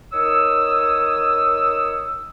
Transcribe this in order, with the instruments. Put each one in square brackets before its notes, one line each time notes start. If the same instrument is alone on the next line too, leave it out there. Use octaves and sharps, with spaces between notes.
[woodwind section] D#3 C#5 D#6 E6